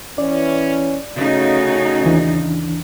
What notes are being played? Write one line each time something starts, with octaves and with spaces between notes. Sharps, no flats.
E3 C#4 D5
C#3 A3 C#4 D#4 F#4
D#2 E3 D4